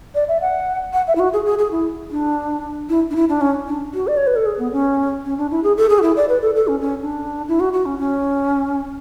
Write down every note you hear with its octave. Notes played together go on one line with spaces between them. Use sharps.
D5
E5
F#5
F#5
E5
E4
F#4
G#4
G#4
G#4
E4
D4
E4
D4
E4
D4
C#4
D4
F#4
D5
C#5
B4
A4
G#4
B3
C#4
C#4
D4
E4
G#4
A4
G#4
F#4
E4
D5
B4
A4
A4
C#4
C#4
D4
E4
F#4
F#4
C#4
C#4